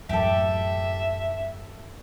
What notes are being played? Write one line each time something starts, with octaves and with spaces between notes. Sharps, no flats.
F#2 A2 F#3 G4 A4 E5